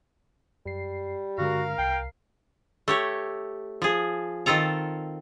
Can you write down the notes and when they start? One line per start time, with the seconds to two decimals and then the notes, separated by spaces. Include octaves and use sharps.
0.66 F#2 G3 C7
1.38 G2 D3 G#3 F#4 A#4 F5
1.78 C2 G5 C7
2.88 A3 G4 C#5
3.82 F3 G#4
4.46 D#3 C4 F4 A4 A#5